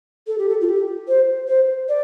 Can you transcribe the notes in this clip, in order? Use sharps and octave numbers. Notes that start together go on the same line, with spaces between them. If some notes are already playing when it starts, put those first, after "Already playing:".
A4
G4
A4
F4
G4
C5
C5
D5